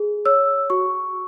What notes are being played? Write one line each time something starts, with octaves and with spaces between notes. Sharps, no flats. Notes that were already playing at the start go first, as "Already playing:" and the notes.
Already playing: G#4
C#5 E6
F#4 C#6